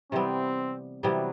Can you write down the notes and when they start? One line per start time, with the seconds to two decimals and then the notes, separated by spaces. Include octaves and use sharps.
0.12 C3 E3 G3 B3 C4
1.02 C3 E3 F#3 G3 B3